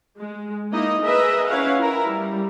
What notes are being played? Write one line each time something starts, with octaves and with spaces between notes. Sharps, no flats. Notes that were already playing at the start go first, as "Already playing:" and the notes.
G#3
A#3 D#4 E4 D#5
G#4 A#4 B4 D#5 E5
C#4 E4 B4 C#5 F5 F#5
E4 A#4
G3